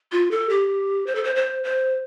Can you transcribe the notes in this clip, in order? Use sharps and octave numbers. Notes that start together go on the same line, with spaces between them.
F4
A4
G4
C5
A4
C5
C5
C5